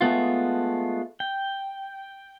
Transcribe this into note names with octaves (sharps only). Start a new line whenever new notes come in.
G#3 A3 B3 F4
G5